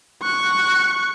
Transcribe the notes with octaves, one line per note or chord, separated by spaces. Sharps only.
C#6 F#6